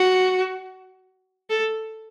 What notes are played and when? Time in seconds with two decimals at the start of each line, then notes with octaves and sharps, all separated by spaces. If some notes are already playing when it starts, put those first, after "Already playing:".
Already playing: F#4
1.50 A4